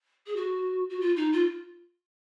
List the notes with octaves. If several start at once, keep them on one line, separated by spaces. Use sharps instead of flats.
G#4
F#4
F#4
F4
D#4
F4